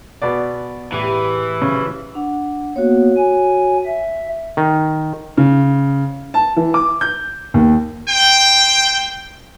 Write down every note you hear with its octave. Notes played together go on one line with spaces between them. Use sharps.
B2 B3 D5
A2 E3 G4 G#4
A#1 C#3 F#3
D4 F#5
A#3 B3 F#4 C#5
G#5
E5
D#3
C#3
A5
E3
D6
G6
D#2
C5 G5